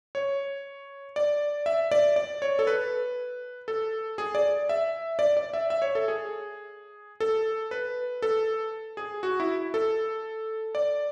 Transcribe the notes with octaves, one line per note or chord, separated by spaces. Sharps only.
C#5
D5
E5
D5
D5
C#5
A4
B4
A4
G#4
D5
E5
D5
D5
E5
E5
C#5
A4
G#4
A4
B4
A4
G#4
F#4
E4
A4
D5